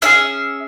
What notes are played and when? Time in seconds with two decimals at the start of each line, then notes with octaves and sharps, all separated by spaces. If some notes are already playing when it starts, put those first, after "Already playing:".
0.02 C#4 E4 G#4 E5